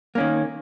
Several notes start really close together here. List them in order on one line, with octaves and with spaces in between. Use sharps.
A#3 C#4 D#3